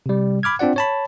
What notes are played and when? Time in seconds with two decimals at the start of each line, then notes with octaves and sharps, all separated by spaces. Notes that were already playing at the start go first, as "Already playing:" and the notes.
0.06 C3 G3
0.43 B5 D6 F6 G#6
0.59 C4 D4 F4 D5 F#5
0.76 C#5 A5 B5